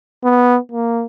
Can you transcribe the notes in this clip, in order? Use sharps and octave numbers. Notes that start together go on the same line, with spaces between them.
B3
A#3